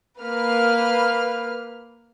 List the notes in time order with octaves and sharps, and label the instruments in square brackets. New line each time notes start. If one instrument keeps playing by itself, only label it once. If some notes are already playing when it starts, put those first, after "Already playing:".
[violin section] A#3 B4 F6